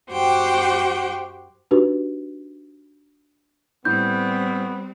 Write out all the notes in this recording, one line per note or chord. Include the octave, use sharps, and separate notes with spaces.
F#2 F#4 G4 C5 F#5 G5
D4 D#4 F#4 G4 B4
A2 G3 B3 C4 G6